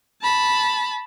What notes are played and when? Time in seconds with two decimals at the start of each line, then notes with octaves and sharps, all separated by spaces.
0.22 A5 B5